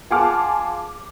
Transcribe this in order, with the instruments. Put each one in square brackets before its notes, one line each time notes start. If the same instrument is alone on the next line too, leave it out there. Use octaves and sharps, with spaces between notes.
[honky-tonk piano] F4 G#4 F#5 A5 D6 F6